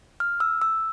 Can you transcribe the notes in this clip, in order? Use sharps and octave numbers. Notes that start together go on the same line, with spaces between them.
F6
E6
E6